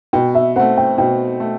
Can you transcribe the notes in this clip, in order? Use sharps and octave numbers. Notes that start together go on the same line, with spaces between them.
B2 G5
E5
A3 C4 F#5
G5
B2 G5
A3